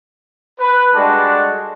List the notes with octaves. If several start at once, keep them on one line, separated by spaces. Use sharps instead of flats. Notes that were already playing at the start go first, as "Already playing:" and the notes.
B4
G3 G#3 D4 F#4 A4 A5